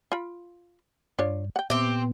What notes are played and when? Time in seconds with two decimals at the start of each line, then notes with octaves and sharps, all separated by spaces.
0.12 F4 B5
1.19 G2 D4 F4 C#5
1.56 F#5 G5
1.70 A#2 B3 C4 G4 E5